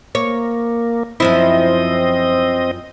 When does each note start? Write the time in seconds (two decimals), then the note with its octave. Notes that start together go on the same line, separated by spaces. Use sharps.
0.15 A#3 C#5
1.20 F#2 F3 C4 E4 D#5